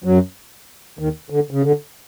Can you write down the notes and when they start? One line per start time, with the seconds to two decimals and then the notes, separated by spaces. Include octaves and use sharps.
0.04 F#2 F#3
0.99 D#2 D#3
1.30 D3
1.51 C#3
1.63 D3